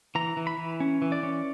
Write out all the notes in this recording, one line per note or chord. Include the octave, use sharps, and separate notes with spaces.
E3 A#5
E3
B5
E3
C#4
E3
D5
C#4